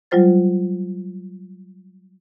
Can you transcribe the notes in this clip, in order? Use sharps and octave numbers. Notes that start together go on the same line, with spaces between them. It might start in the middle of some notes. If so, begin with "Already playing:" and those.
F#3 G3 F4 C5 A6